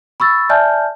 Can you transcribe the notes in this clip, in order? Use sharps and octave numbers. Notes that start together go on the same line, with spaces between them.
B5 C#6 E6 A6
D5 E5 G#5 A5 F6 G6